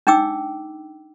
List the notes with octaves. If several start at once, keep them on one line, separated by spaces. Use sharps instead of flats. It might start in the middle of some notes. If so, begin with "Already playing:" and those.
D4 D#4 G5 D6 E6